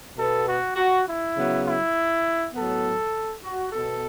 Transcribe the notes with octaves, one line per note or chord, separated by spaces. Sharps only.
B2 B3 A4
F#4
F#4
E4
C#3 F#3 B3
E4
A2 F#3 B3 A4
F#4
B2 B3 A4